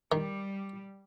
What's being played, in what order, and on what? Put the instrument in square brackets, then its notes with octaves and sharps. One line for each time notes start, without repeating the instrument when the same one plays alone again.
[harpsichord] D#3 [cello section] G3